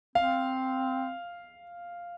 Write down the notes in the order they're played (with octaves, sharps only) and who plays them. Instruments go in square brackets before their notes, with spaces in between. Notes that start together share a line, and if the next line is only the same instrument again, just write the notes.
[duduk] C4 [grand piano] F5